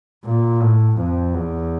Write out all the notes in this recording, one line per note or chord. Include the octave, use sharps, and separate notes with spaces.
A#2
A2
F2
E2